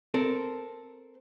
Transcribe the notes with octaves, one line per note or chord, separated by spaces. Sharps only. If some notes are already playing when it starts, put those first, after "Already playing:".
C4 A4 A#4